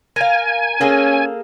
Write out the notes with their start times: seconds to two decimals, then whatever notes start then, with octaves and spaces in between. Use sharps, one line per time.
0.16 A#4 F5 G#5
0.81 A#3 C#4 G#4 A4